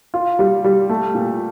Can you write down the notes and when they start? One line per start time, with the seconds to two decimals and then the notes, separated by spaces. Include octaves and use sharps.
0.14 F4
0.39 G3
0.64 G3
0.89 A3
1.15 A#2